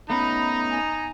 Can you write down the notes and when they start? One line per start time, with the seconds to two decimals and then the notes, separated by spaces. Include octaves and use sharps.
0.10 A3 B3 C#4 D#4 A#5 B5
0.70 G#5